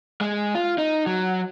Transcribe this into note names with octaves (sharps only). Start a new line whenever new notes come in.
G#3
F4
D#4
F#3